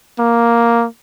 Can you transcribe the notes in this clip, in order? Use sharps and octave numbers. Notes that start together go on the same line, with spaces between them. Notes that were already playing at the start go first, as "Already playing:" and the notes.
A#3